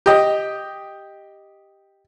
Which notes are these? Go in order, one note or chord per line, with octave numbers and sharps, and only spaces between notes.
G4 D#5